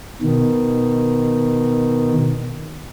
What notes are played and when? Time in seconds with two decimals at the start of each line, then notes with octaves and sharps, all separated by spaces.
0.22 B2 D#3